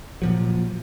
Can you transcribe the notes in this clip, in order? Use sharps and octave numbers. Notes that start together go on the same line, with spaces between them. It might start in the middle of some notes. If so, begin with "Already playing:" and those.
A#2 F3 F#3